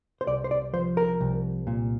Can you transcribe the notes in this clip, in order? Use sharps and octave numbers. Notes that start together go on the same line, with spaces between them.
C5
C2 D5
C5
D5
F3 C5
A#4
C2
A#2